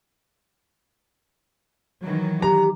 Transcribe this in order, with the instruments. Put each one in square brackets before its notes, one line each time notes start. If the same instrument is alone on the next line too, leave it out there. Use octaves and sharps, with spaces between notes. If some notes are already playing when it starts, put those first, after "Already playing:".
[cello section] D#3 E3 F#3
[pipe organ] G4 [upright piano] A#5